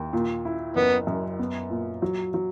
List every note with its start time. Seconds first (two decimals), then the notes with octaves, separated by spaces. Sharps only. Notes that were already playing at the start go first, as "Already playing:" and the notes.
Already playing: D#2
0.13 A#2
0.45 E4
0.75 F#1 B3
1.07 F#2
1.39 B3
1.70 A#2
2.02 F#3
2.34 F#3